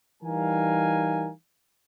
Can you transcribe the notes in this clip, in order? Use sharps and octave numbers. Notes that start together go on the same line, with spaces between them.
E3 G3 D#4 A#4 F5 G#5